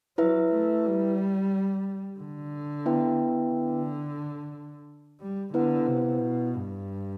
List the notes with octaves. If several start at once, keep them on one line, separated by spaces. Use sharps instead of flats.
F#3 E4 B4 E5
A3
G3
D3
B3 E4 B4 E5 G5
D3
G3
D3 B3 E4 B4 F#5
C3
B2
G2